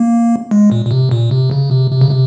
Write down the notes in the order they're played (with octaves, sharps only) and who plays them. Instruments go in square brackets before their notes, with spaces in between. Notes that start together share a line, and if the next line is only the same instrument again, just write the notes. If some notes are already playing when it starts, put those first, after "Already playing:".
Already playing: [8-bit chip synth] A#3
G#3
A#2
A#2
C3
A#2
C3
C#3
C3
C3
C#3
C3